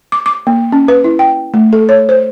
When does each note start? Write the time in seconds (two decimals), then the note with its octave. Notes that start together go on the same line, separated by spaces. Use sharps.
0.12 D6
0.26 D6
0.47 A#3
0.72 C#4
0.88 B4
1.04 E4
1.19 G5
1.54 A3
1.73 A4
1.89 C#5
2.09 C5